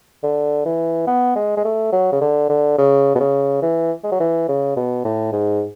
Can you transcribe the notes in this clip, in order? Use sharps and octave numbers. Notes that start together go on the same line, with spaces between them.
D3
E3
B3
G#3
G#3
A3
F#3
C#3
D3
D3
C#3
B2
C#3
E3
G#3
F#3
E3
C#3
B2
A2
G#2